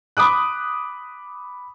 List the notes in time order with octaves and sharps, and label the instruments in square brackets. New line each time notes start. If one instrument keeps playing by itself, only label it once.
[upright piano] B5 D6 D#6 F#6